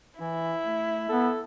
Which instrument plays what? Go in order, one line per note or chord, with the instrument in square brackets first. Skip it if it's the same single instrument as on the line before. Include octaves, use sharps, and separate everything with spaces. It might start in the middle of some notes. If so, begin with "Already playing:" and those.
[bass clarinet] E3 [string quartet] E4
[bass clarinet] A3
[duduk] B3 [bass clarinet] A4